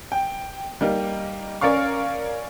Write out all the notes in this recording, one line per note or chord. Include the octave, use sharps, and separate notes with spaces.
G5
G3 A#3 D#4
C#4 A#4 D5 F5 C#6